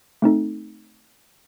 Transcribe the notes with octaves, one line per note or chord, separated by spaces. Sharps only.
A3 C4 D#4 A4